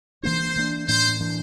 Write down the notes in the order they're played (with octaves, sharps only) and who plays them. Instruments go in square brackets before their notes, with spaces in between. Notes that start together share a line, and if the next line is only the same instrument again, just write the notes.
[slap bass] E3 A#3 D4 [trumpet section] C5
[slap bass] E3 A#3 D4
[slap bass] A2 E3 A#3 D4 [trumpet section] C5
[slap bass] A2 E3 A#3 D4